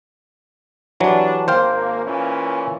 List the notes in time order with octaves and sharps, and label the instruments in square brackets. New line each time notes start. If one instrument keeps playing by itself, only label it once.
[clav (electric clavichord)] E3 F#3 [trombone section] G3 D4
[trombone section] G#1 A#3 [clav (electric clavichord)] C5 F5 G5
[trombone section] A#2 E3 C#4